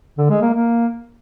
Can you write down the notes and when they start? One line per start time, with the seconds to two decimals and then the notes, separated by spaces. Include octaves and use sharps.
0.18 D3
0.30 G#3
0.42 A#3
0.54 A#3